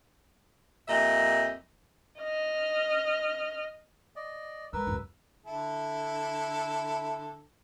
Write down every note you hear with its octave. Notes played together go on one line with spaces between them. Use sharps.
F2 A#2 G4 D#5 E5
D#5 F6
D5 D#5
G#3 A#4 B4 E6
C#2 F#2
D3 E4 A4